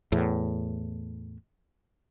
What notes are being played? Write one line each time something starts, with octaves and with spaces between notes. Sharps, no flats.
E2 A2